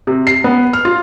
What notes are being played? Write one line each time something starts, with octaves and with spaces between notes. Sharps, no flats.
C3
C7
B3
F6
F4